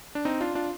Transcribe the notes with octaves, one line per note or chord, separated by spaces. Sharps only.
D4
C4 D#4
D4 F4
D4 F4